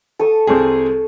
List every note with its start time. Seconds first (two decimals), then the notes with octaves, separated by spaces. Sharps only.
0.19 A4 C#6 D#6
0.47 C2 C4 G#4